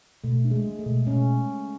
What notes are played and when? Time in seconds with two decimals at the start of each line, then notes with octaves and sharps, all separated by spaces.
0.24 B2 A3
0.45 D4
0.51 G#3
0.65 G#3
0.79 A3
0.86 B2
1.06 B2 C#4